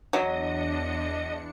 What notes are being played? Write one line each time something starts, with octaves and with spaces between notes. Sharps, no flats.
E2 F#3 D4 D#5 C#7